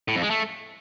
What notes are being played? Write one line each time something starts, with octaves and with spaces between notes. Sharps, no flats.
A2
F2
G#3
A3